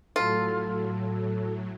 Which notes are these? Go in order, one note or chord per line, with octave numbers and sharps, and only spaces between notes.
A2 F#3 F4 A4